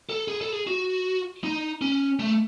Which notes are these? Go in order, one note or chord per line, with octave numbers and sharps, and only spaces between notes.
A4
G#4
A4
G#4
F#4
D#4
C#4
A3